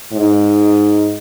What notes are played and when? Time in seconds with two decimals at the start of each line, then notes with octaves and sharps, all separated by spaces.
0.13 G#2